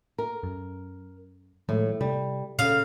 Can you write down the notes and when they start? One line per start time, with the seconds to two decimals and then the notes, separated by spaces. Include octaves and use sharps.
0.18 A#4
0.43 F#2
1.69 A2 D#3 F3 G#3
2.01 C3 G3
2.59 A#2 C#3 F5